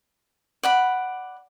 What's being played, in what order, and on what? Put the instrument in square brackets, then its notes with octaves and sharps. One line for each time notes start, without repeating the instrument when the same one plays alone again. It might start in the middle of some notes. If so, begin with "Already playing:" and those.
[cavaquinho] D5 F#5 B5